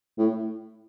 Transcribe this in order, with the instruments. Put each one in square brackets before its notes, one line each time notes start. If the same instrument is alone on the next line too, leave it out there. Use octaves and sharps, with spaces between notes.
[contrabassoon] A2